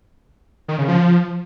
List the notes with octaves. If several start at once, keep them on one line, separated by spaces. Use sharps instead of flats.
D#3
C#3
F3